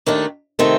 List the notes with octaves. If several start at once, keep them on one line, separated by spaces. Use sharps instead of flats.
D#2 D#3 A3 D4
C3 D#3 A3 C4